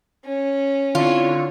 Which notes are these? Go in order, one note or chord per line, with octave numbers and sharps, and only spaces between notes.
C#4
D3 C4 E4 F4 C#5